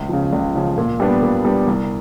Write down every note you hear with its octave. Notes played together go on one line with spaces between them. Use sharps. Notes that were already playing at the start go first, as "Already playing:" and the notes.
Already playing: C#2
C#3 F3
C#2
C#3 F3
A#2
G3 B3 D4
A#2
G3 B3 D4
C2